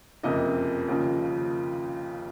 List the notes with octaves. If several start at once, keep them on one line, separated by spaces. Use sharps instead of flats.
F#1 F2 C3 D#5
D#2 C#3 F3